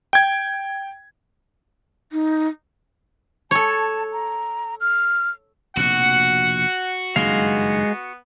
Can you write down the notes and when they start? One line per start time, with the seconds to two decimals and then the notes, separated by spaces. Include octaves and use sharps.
0.13 G5 G#6
2.12 D#4
3.51 A4 C#5 A5
4.12 A#5
4.81 F6
5.77 F1 A#1 B2 F#4 F#5
7.16 F#1 G2 D#3 G#3 B3 F5